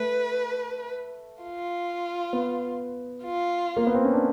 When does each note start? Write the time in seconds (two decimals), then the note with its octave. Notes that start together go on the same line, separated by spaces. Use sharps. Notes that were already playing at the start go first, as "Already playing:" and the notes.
Already playing: A3 B4
1.43 F4
2.33 B3
3.23 F4
3.77 A#3
3.87 B3
3.95 C4
4.05 C#4
4.13 D4